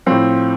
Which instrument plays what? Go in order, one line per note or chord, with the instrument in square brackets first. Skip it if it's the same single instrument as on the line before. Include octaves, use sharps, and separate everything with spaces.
[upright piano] A2 F3 C4